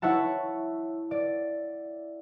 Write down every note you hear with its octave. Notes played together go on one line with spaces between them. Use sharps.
E4 C#5 E5 F#5 A5
D5